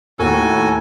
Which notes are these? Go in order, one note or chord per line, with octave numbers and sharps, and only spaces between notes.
D#2 A2 F#4 A4 G#5